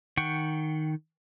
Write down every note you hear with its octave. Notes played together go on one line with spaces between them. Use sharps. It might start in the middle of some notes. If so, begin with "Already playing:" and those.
D#3 F#5 G5 C#6